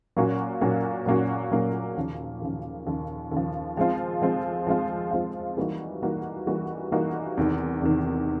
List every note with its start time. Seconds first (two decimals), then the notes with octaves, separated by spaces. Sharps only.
0.16 A#2 F#3 A#3 C#4 F#4
0.61 A#2 F#3 A#3 C#4 F#4
1.06 A#2 F#3 A#3 C#4 F#4
1.51 A#2 F#3 A#3 C#4 F#4
1.97 D#2 C#3 F3
2.42 D#2 C#3 F3
2.87 D#2 C#3 F3
3.32 D#2 C#3 F3
3.77 F3 G#3 C4 F4
4.22 F3 G#3 C4 F4
4.67 F3 G#3 C4 F4
5.11 F3 G#3 C4 F4
5.57 E3 G3 A#3 D#4 F#4
6.02 E3 G3 A#3 D#4 F#4
6.47 E3 G3 A#3 D#4 F#4
6.92 E3 G3 A#3 D#4 F#4
7.37 E2 C3 D#3
7.82 E2 C3 D#3